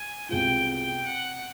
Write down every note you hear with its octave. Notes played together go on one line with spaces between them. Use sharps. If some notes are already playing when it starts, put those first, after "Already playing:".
Already playing: G#5
C2 B2 G#3 C4 F4 G5
G5
F#5